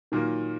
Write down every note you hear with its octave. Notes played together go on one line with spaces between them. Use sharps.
A#2 D#3 F#3 A#3